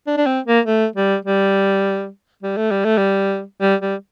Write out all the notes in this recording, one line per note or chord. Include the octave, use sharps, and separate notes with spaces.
D4
D4
C4
A#3
A3
G3
G3
G3
A3
G3
A3
G3
G3
G3